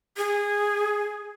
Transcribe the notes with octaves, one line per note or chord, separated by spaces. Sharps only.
G#4